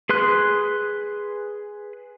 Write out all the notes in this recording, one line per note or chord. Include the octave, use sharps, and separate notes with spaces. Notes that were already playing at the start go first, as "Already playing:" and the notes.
G#4 B4 C6 F#6